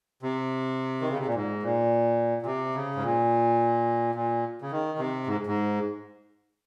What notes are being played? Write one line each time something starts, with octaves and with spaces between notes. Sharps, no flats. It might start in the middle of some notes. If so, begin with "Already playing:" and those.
C3
D#3
C#3
C3
A#2
G#2
A#2
A#2
C3
C#3
G#2
A#2
A#2
C#3
D#3
C3
G#2
G#2